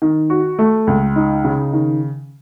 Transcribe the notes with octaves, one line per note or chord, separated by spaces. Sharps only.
D#3
F#4
A3
C#2
D#4
C#3
D#3